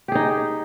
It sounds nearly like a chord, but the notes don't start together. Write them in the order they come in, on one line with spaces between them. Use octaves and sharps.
G4 G#4 D#4